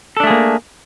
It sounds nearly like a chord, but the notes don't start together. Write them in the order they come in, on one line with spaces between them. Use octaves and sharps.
A4 D4 A3 G#4 A#3